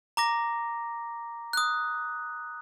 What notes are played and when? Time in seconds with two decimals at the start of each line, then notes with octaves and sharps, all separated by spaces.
0.17 A#5 D6 A#6
1.53 D#6 F#6